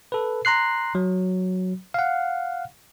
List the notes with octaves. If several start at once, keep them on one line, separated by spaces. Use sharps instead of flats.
A4 B4
A#5 C6 F#6 C7
F#3
F5 F#5